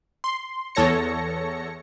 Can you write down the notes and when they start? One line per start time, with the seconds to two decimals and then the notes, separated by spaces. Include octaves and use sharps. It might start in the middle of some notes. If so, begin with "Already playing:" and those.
0.24 C6
0.75 E2 A4 C#5 A#6 C#7